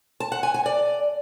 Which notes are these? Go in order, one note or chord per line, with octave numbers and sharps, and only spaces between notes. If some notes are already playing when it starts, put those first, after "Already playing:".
A5
F#5
G#5
G#5
D5